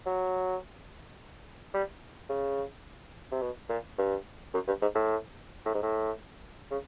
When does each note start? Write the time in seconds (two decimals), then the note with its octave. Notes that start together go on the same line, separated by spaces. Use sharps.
0.06 F#3
1.74 G3
2.29 C#3
3.32 C3
3.42 B2
3.69 A#2
3.98 G2
4.54 F#2
4.67 G2
4.82 G#2
4.95 A2
5.65 A2
5.74 G#2
5.83 A2
6.71 C#3